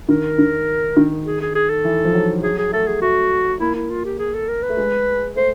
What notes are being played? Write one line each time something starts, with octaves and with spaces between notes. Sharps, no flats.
D#3 A#4
D#3
D#3
G#4
G#4
G#4
A4
E3
F3
F#3
F#3 G#4
G#4
A3 A4
G#4
A3 F#4
A#3 E4
E4
F4
G4
G#4
A4
A#4
B4
A3
G#3
A3 C5